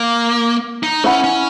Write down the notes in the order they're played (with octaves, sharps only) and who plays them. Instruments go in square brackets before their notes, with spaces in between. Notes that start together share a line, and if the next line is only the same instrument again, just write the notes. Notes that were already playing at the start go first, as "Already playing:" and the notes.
Already playing: [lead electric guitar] A#3
D#4
[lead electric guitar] C#4 [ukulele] E4 B4 F#5 B5
[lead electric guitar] C#4